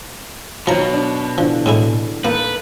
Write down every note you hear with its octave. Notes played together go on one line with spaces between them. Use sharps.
B2 D#3 F3 F#3 A#5
D4
D3 E3 F3
A2 G#3 E4
A#3 D#4 A4 B4 F#5